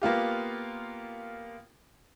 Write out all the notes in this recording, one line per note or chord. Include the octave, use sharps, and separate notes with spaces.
A#3 B3 F4 G4